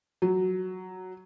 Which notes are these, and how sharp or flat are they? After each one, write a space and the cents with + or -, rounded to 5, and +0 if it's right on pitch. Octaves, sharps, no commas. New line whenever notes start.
F#3 +5